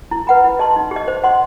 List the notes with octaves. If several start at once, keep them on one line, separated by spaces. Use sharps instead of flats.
E4
B4 F#5 B5
E4
G4 D#5 A5 C6
D#4
G4
D#5
C5
D#5 F#5 C6